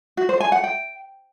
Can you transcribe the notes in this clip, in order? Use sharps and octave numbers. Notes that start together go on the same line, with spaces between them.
F#4
C5
G#5
F#5
G5